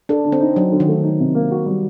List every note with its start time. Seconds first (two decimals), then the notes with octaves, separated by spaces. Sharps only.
0.09 D4 A4
0.25 D3
0.32 C4
0.40 D#4
0.56 F#3 D4
0.72 D3
0.80 D#3
0.88 A3
1.03 D#4
1.19 C3
1.35 A#3
1.51 F#4
1.66 G3